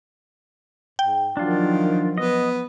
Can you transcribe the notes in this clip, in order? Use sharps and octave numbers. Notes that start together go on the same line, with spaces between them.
G#2 G5
D#3 F3 F#3 D4 F4
B3 D#5